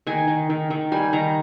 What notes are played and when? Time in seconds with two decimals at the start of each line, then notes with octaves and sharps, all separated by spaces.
0.07 D#3 G#5
0.28 D#3
0.50 D#3
0.70 D#3
0.92 G3 G#5
1.13 D#3 A#5